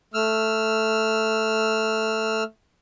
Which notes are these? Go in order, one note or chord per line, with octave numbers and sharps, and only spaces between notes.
A3 E6 F6